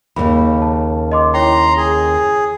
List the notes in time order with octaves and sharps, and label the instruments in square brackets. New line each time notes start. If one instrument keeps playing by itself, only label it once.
[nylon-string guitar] D#2 A#2 C#3 [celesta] B5
[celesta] A5
D#5 C6 D6
[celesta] E4 C#5 G5 [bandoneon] A#5 C6
[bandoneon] G#4